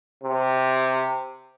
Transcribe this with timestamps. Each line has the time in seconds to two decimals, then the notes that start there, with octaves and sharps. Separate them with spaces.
0.24 C3